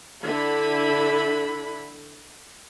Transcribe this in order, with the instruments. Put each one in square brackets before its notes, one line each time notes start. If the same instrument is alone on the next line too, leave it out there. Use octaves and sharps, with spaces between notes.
[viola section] D3 E4 B5